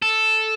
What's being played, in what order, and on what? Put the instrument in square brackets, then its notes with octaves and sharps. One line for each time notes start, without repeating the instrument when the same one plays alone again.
[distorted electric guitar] A4